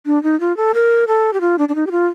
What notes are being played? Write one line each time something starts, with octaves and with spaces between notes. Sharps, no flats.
D4
D#4
F4
A4
A#4
A4
G4
F4
D4
D4
D#4
G4
F4